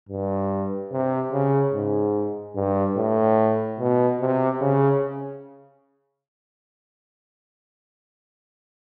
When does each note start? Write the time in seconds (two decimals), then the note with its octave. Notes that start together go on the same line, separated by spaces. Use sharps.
0.09 G2
0.92 C3
1.32 C#3
1.73 G#2
2.55 G2
2.97 A2
3.79 B2
4.21 C3
4.61 C#3